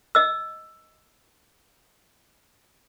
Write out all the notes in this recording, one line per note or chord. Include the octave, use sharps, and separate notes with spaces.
D#5 E6